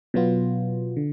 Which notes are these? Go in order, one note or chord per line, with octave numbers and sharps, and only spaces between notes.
B2 F#3 B3 F4
D3